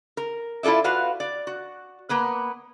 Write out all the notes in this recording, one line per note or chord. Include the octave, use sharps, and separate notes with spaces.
A#4
E4 F4 A4 D5 E5
F4 F#4 B4 F5
D5
F#4
A#3 B3 B4